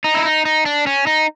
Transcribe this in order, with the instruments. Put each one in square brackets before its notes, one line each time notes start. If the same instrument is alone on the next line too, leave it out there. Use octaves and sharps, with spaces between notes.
[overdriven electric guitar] D#4
E4
D#4
D#4
D4
C#4
D#4